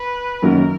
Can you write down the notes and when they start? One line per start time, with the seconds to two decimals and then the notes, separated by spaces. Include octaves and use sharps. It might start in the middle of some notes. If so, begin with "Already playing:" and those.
Already playing: B4
0.42 F#2 D#3 F#3 A#3 A#4